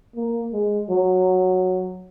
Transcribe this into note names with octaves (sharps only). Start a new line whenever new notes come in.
A#3
G#3
F#3